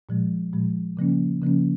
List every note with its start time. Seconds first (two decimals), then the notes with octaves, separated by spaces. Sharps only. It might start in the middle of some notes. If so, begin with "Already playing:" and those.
0.09 A#2 F3 G#3
0.53 A#2 F3 G#3
0.97 C#3 F3 A#3 C#4
1.42 C#3 F3 A#3 C#4